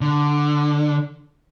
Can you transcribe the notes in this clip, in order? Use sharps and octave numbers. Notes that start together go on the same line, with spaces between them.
D3